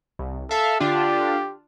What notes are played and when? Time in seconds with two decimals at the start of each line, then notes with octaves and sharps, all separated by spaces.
0.19 C2
0.51 A4 E5 F5
0.80 D3 D4 F4 G4